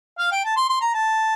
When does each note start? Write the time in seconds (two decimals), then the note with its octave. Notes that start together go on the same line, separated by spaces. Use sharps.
0.19 F5
0.32 G5
0.45 A5
0.56 C6
0.69 C6
0.81 A#5
0.94 A5